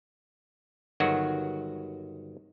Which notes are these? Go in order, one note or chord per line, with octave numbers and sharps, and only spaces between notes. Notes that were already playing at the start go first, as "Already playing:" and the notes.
G1 D#3 F#3 F#4